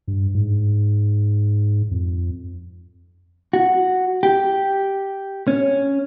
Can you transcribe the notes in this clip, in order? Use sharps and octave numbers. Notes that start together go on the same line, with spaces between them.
G2
G#2
F2
F#4
G4
C#4